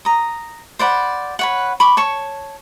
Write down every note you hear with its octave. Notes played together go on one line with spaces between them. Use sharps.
A#5 D#6
C5 D5 F#5 B5
B4 C#5 F#5
B5 C#6 D6
C#5 A5 C#6